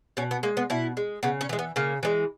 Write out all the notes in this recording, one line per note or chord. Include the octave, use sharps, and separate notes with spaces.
B2 C#4
B3
G#3 A#3
B3
B2 E4
G#3
C#3 B3
C#4
E3 G#3
B3
C#3 A#3
E3 G#3